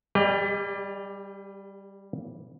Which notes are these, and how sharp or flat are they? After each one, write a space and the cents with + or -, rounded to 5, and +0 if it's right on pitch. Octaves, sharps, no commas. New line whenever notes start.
G3 +0 G4 +45 D#5 -15